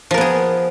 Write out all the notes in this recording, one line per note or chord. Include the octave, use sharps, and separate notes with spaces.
F3 B3 G#4 A#4